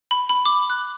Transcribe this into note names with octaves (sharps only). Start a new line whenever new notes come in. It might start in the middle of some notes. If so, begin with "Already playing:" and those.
B5
B5
D6
F#6